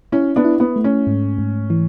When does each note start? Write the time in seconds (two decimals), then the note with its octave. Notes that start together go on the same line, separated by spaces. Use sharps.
0.12 C#4 E4
0.36 B3 D4
0.45 E4
0.60 B3
0.76 A3
0.84 C#4
1.07 G#2
1.38 G#2
1.70 E3